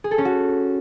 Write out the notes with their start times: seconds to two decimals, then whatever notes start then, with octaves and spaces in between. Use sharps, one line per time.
0.04 G#4
0.11 A4
0.18 C#4
0.25 F#4